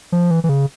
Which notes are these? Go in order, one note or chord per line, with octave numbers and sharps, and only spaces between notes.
F3
E3
E3
C#3